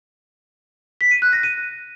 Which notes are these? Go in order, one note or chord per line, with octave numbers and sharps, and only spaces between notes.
B6
D#7
F#6
A#6
D#7